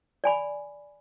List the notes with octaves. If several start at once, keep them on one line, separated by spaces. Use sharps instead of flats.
D5 G#5 B5